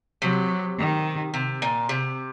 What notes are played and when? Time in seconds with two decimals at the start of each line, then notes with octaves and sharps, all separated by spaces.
0.22 C3 F#3
0.79 D#3
1.34 C3
1.62 A#2
1.89 C3